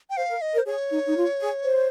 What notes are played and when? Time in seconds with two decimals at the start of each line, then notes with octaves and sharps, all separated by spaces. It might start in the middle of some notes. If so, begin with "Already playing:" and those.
0.10 G5
0.17 C5 F5
0.29 A#4
0.41 D#5
0.54 A#4
0.58 C5
0.66 G#4 C#5
0.90 D#4
1.06 D#4
1.16 F4
1.40 G#4
1.65 C5